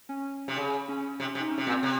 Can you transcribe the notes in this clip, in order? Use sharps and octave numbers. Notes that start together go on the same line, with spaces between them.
C#4
C3
C#3
C#4
C3
C3
D#4
C#4
C3
A#2 C4
C3